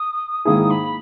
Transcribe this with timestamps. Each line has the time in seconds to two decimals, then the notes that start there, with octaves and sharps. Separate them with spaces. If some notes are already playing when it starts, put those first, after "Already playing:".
Already playing: D#6
0.45 G#2 D#3 A#3 E4 G#4 D#6
0.70 B5